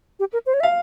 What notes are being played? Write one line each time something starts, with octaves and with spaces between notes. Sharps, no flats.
G4
A#4
C5
C#5
E5
F5